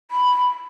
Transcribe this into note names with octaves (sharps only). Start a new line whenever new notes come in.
B5